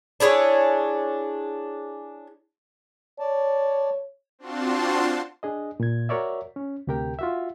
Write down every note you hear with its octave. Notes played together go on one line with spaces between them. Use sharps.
D4 E4 G#4 C#5
C#5 D5 A5
C4 D4 F4 F#4 A5 C6
D4 G#4 D#5
A#2 G#6
F#4 A#4 C#5 D5 E5
C#4
D2 C3 G4 A#4 G5
F4 F#4 E5